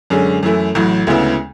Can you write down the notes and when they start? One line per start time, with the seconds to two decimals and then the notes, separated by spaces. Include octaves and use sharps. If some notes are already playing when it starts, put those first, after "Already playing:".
0.10 F#2 D3 G#3 C#4
0.43 F#2 E3 A3 E4
0.75 A1 A2 F#3
1.07 D2 C#3 G#3 B3 E4